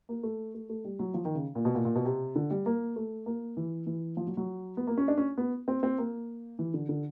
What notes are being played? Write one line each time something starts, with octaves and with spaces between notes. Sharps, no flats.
A#3
A3
A3
A3
G3
F#3
F3
D#3
C#3
A#2
B2
A#2
A#2
B2
C3
D3
G3
A#3
A3
A#3
E3
E3
F3
F#3
F#3
B3
A#3
C#4
D4
C#4
B3
C4
C4
A#3
E3
D3
D3